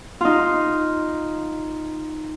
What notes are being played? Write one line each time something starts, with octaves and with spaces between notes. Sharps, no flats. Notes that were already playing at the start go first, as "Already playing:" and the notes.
D#4 F4